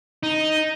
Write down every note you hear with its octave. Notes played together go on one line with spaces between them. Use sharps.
D#4